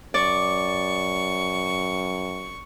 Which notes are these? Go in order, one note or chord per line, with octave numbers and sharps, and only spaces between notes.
F#2 D5 C#6